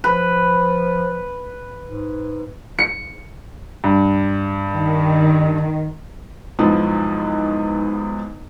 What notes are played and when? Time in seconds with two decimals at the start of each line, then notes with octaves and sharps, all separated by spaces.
0.04 F3 B4
1.83 G#2
2.79 C#7
3.84 G2
4.74 D#3
6.59 B1 E2 G#2 F3 B3